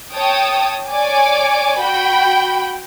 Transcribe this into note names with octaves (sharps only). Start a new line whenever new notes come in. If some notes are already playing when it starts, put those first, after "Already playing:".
C#5 G5 A5 D#6
C#5 D5 G#5 D6
F#4 G5 B5